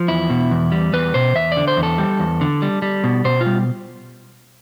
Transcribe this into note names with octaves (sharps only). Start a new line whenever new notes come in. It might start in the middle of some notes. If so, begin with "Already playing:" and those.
Already playing: F3
E2 E4
B2
E2
G3
E2 B4
B2 C5
E2 E5
D5
D3
C5
E2
A4
G3
E2
D3
G3
G3
B2
B2 C5
F4
G3